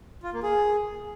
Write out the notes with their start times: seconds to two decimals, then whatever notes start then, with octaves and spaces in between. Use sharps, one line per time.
0.23 F4
0.33 A#3
0.43 G#4